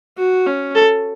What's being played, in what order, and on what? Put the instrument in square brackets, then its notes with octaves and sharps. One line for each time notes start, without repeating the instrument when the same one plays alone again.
[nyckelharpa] F#4
C#4
[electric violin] A4